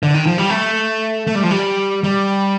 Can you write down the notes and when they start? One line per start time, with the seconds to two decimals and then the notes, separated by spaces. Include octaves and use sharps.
0.03 D3
0.14 D#3
0.27 F3
0.38 G3
0.50 A3
1.27 A3
1.35 G3
1.43 F3
1.51 G3
2.04 G3